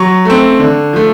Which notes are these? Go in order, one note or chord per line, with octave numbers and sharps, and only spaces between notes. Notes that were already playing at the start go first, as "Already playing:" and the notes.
Already playing: F#3 C#6
A3 C4
D3
F3 A3